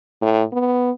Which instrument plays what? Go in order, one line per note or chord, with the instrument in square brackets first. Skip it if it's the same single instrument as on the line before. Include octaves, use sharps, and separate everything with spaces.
[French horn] A2
B3